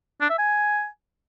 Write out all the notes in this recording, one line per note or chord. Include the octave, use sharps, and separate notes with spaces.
D4
E5
G#5